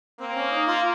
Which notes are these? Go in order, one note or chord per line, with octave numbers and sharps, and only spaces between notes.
A#3 C4
C#4
D#4
F4